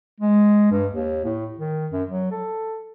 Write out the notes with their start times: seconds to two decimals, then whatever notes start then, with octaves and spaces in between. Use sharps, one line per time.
0.20 G#3
0.71 G2
0.92 D#2
1.25 A2
1.59 D#3
1.92 F#2
2.09 F#3
2.32 A4